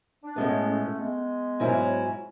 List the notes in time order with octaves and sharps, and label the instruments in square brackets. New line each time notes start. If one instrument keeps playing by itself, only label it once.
[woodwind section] D4
[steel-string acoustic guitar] A2 G#3 B3 [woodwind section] A3 C#4
[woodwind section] A3 C#4
G#3 B3
[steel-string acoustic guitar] G#2 F#3 C#4 E4